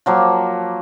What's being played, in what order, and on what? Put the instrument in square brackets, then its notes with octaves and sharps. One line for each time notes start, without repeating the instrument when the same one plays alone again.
[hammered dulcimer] F3 F#3 A#3 A#4